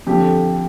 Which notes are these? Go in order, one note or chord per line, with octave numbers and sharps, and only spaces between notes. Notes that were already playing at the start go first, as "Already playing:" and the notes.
F2 D3 F3 G4